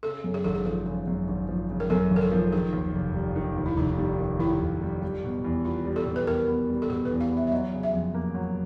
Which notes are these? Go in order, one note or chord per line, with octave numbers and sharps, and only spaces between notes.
C#3 A4
F#2
G#4
G#1 A4
G#4
F3 A4
C#3
F#2
G#1
F3
C#3
A#4
F#2 A4
G#1
A#4
A4
F3
D#3 G#4
D#2
F1
G3
D#3
D#2
E4
F1 D#4
G3
D#3
D#2 E4
F1
G3
G3
B2
E2
B3 F4
G3
A4
B2
B4
E2 A#4
B3
G3
A4
B2 G#4
B4
E2
F5
B3
E5
E5
F#3 D#5
C#3
E5
F2
A#3
F#3